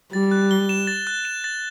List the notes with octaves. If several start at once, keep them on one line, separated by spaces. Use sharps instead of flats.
G3 A6
F#6
G7
E7
A6
F#6
E7
A6